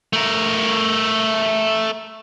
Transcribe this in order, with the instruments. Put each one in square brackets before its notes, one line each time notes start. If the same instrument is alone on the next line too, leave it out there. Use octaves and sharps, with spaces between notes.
[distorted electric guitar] A3 A#4